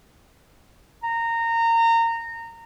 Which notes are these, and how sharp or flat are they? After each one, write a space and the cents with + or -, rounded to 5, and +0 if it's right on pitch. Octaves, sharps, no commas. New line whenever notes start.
A#5 -20